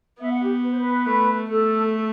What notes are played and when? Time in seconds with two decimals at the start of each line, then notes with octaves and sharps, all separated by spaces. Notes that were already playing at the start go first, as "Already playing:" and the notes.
0.19 B3 E5
0.29 F#5
0.41 G4
0.62 B4
0.71 C5
0.78 B4
1.05 A3
1.49 A3 A4
1.92 A4